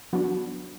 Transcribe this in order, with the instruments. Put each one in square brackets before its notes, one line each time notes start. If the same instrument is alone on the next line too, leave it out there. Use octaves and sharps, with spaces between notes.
[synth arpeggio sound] F#3 B3 D4 F#4